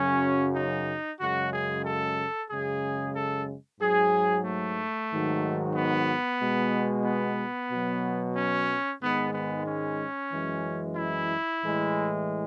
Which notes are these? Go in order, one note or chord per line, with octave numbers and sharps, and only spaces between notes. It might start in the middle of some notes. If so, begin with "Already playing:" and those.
Already playing: F#2 C#3 F#3 C#4
D#4
F#2 C#3 G#3 F#4
G#4
A4
F#2 C#3 G#3 G#4
A4
G#2 F#3 G#4
A3
G#2 D#3 F#3
B3
B2 G#3
B3
B2 F#3
C#4
G#2 D#3 G#3 B3
B3
C#4
F#2 E3 G#3
E4
A2 E3 G#3